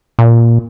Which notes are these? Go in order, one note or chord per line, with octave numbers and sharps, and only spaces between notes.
A#2